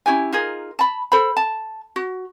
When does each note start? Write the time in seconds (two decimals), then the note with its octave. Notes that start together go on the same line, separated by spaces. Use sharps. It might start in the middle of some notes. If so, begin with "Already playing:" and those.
0.06 C#4 E4 G4 G#5
0.32 D#4 F4 G#4 A#4
0.79 A5 B5
1.12 A4 C5 B5
1.37 A5
1.96 F#4